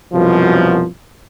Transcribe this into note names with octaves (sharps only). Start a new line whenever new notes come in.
C2 F#2 B2 F3